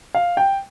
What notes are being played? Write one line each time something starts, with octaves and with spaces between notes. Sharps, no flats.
F5
G5